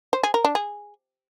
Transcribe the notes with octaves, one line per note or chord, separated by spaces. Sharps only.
C5
G#4
A#4
D4
G#4